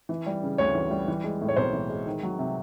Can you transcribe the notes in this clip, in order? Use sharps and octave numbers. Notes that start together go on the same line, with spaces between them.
E3
G3
C#3
D2 C#5
E3
G3
E3
G#3
A2
C#5
B1 C5
E3
G#3
D#3
F#3
C3